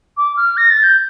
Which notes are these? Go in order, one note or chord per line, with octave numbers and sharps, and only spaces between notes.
D6
F6
A#6
A6
G6